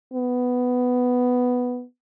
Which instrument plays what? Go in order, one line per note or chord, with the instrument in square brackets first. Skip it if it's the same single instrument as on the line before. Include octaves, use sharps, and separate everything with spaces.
[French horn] B3